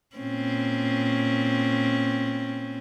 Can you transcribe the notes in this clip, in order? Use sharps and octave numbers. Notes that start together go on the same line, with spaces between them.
A#2 C4 C#4